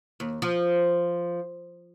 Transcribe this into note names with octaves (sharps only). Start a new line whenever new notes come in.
D#2
F3